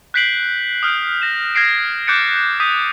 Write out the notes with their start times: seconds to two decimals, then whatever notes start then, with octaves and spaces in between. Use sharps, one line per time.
0.14 F#6 G6 B6 C7 D7 F#7
0.83 D#6 F6 G6 D7
1.22 A#6 E7
1.55 F6 G#6 A#6 C7 D7
2.07 D6 F#6 G6 A6 C#7 D7
2.60 D#6 G6 B6 D#7